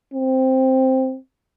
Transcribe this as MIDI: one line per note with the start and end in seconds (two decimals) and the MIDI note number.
0.13 1.17 60